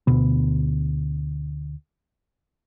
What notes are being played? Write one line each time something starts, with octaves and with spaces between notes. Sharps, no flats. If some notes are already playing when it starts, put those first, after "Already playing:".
D2 B2 B3